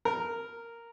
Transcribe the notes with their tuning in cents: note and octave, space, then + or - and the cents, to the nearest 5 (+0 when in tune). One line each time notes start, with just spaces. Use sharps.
A#4 -5